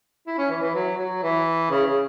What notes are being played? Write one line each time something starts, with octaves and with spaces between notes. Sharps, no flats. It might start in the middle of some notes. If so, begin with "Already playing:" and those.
E4
C#4
E3
E3
F#3
F#3
E3
C#3
C#3